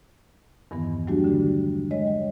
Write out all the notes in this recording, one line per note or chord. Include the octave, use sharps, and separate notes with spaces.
E2 G2 D#3 E3 B3
F#3 G3 A3 D4 F#4 G4
D3 G4
G3 G#3 C#5 D#5
G3